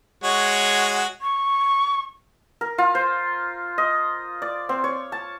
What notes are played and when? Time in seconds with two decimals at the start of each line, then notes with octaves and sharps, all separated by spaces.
0.24 G#3 F#4 C#5
1.21 C#6
2.61 A#4
2.78 F4
2.95 C5
3.78 D#5
4.42 D5
4.69 C4
4.84 C#5
5.12 A5